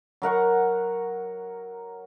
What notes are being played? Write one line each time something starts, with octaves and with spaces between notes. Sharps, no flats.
F#3 A#4 F#5 C#6